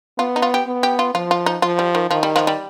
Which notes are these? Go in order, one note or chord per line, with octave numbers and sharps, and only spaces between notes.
B3 F4
D#4
F4
G4
B3
G4
F4
F3 F4
F4
D#4
F3 F4
G3
D#3
D#3 F3
G3
F3
G3